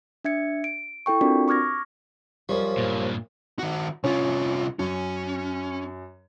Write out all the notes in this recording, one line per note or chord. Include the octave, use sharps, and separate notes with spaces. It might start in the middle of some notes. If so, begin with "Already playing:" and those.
D4 E5 G#6 C#7
D7
E4 A4 G5 C#6
C4 D4 F4 F#4 A#4 D5
C#6 D6 F6 G#6 A#6
F#2 F3 G3 C5
G2 A#2
D#3 F#4
C2 C#4 F4
F#2 C#4